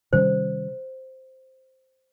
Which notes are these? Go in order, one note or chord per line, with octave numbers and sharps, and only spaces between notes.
C3 D#3 G3 C#4 C5